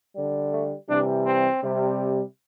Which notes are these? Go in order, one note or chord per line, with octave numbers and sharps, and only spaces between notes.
D3 G3
A3
C3 E3 G3 D4
C4
C3 G3